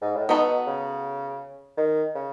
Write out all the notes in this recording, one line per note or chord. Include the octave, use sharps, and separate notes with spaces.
G#2
A2
B2 B3 D#4 F#4 A4
C#3
D#3
C#3